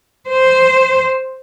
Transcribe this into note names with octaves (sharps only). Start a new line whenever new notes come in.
C5